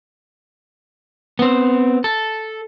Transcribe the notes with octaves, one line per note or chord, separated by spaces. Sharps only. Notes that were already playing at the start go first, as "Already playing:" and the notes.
B3 C4
A4